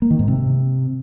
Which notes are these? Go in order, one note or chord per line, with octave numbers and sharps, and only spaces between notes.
A#3
D#3
G#2
C3